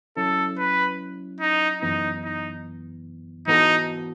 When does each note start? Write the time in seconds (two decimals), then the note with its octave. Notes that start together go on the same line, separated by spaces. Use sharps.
0.17 F#3 C#4 E4 A4
0.58 B4
1.41 D#4
1.82 F#2 E3 B3 D#4
2.24 D#4
3.47 G#2 E3 B3 D#4 F#4 A4